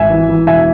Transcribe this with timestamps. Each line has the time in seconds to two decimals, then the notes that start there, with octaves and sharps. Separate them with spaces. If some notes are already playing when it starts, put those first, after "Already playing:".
Already playing: G#1 E5 G#5
0.10 E3
0.29 E3
0.47 E1 E5 G#5